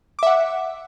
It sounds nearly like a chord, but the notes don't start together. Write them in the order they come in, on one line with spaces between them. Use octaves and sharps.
D6 E5 F#5